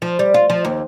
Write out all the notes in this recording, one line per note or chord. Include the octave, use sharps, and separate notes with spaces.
F3
G3
F4
F3
D#2